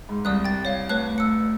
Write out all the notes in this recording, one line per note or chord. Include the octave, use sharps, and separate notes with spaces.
G#2
C2 D5 D#6 F#6
G5 A6
C#5 F5
A3 B4 C#5 F#6
E6 C#7